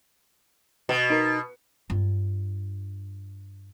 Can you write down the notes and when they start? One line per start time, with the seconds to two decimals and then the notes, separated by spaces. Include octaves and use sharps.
0.89 B2
1.10 D#4 A#4
1.90 G2 F4